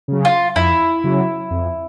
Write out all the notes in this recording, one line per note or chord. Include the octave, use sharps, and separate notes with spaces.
C#3 F#3
F4
F2 E4
C#3 F#3
F2